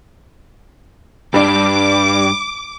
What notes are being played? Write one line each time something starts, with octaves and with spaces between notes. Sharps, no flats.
G2 G3 D4 D6